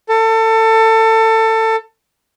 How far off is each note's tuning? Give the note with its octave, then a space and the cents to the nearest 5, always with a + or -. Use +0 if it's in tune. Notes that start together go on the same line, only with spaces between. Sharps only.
A4 +25